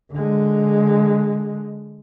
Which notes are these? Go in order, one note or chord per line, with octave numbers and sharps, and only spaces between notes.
D3 G#3